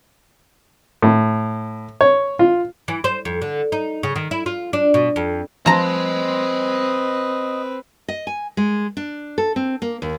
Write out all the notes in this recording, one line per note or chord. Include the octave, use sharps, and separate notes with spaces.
A2
C#5
F4
E3
C5
F2
D3
D#4
C#3
D#3
E4
F4
D4
B2
F2
F3 C4 B4 D#5 A#5 C6
D#5
G#5
G#3
D4
A4
C4
A#3
D#2